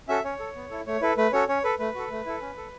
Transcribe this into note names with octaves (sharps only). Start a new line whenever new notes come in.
C#4 F#4 A4 E5
C#4 C#5
A4
B3
E4 A4
A3 C#5
E4 A4 B4
A3 B4
C#4 F#4 A4 C#5
C#4 C#5
A4 B4
A3 B4
F#4 A4
A3
E4 A4
C#4
A4